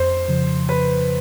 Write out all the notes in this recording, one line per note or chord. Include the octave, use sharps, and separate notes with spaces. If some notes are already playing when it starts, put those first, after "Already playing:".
Already playing: F2 C5
C#3 F3
B4